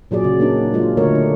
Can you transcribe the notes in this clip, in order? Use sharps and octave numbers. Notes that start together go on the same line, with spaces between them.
A#2 F#3 G#4 D5
C#3
A#3 D4 D#4
F#3 G#3 F4
D3 A3 A#4 C#5
D4